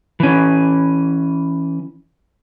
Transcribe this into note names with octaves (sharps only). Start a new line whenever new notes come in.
E3 C#4